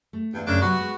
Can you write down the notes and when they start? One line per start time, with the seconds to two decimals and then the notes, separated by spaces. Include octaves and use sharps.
0.13 A3
0.33 E2 G2
0.46 F#2 C#3 C#4 D4
0.61 C3 D#3 F#3 B3 F#4
0.79 G#3